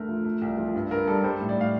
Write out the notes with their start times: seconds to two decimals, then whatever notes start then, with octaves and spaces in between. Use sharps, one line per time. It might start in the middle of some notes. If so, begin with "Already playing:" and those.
Already playing: D2 A3 A#4
0.09 F3
0.25 A3
0.42 C2
0.58 F3
0.75 G2
0.91 G2 A#4
1.07 G3 A4
1.24 G3 C5
1.41 A2
1.49 D5
1.57 A2 F5